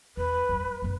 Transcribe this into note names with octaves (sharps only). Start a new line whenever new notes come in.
E2 B4
F2 G3
F#2 A3